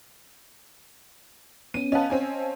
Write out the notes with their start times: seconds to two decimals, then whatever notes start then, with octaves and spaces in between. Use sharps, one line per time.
1.74 B3 C#4 D#7
1.92 B3 C#4 D#5 F5 A5
2.10 C4 C#4 G#5